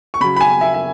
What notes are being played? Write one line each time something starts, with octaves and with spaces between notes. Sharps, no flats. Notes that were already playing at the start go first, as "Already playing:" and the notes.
C#6
C#3 F#3 B5
B5
G#5
E5
E5